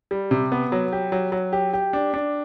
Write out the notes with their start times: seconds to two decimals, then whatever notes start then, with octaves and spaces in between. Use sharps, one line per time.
0.11 G3
0.31 C3
0.52 B3
0.72 F#3
0.92 G4
1.12 F#3
1.32 F#3
1.53 G4
1.73 G4
1.93 D4
2.14 D4